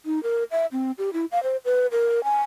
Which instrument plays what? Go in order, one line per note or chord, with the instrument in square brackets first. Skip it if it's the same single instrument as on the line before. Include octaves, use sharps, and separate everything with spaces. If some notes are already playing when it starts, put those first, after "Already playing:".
[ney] D#4
A#4
E5
C4
G4
E4
F5
C5
B4
A#4
G#5